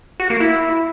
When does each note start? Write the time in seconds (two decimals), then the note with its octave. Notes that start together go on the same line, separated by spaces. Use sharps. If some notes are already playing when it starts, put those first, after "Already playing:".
0.20 F#4
0.30 A#3
0.41 E4